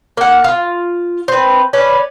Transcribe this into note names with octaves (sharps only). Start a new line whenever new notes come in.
A#3 F#5
F4
C4 B4
C#4 D4 B4